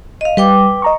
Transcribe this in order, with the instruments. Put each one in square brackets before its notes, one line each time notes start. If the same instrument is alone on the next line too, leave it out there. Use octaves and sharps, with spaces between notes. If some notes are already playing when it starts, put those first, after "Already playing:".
[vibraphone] D#5 F5
[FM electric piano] G3 [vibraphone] B4 G5 D6
[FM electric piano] D#5 A#5 C#6